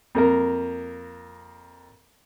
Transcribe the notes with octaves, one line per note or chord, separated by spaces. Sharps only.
F2 A#3 A#4